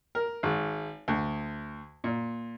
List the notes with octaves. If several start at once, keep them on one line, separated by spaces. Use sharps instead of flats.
A#4
G#1
D2
A#2